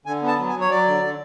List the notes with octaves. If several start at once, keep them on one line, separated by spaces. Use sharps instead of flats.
D3 G#5
B3
A5
F#3
G#5
F#3
C#5
F#3 D5
D3
D3